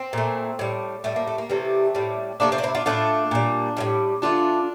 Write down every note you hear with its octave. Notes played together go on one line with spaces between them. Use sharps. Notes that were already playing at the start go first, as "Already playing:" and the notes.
Already playing: C4
A#2 A3
A2 G3
A2 G3 A3
A#3
A3
A#3
C3 E3 G3 A3 C4
A2 G3
C3 F3 A3 A#3 D4
A3 C4
D4
C4 E4
D4 F4
A2 F3 A3 D4 F4
A#2 G3
A2 E3 G3
D3 A3 D4 F4